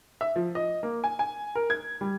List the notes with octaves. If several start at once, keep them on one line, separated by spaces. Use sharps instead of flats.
E5
F3
D#5
A#3
G#5
G#5
A#4
G#6
G3